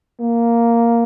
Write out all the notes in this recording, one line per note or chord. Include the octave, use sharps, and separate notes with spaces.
A#3